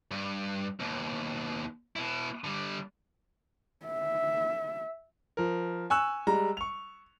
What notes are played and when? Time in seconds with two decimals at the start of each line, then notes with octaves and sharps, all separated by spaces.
0.11 G2
0.80 D#2 B2
1.96 B2 E4
2.44 D3 G3
3.86 E5
5.37 F3 A#4
5.90 G#5 C#6 E6 F#6
6.27 G3 G#3 A#5
6.57 C#6 F7